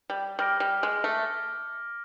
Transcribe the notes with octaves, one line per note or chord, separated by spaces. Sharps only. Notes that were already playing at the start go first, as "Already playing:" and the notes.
G3
G3 D6 F6 A#6 D7
G3
G#3
A3